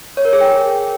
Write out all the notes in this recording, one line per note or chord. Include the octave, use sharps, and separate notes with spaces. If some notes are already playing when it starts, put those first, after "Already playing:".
C#5
A#4
G#4
G5